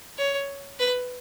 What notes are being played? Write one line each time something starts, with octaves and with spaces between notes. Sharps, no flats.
C#5
B4